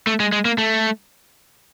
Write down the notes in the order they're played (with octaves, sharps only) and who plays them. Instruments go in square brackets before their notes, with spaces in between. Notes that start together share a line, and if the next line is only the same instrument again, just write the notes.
[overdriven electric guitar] A3
G#3
G#3
A#3
A3